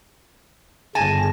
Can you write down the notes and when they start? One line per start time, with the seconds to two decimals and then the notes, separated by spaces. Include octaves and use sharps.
0.95 G1 C#3 G#5 A5 A#6